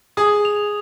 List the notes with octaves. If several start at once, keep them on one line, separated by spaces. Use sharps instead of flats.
G#4 D#6
F7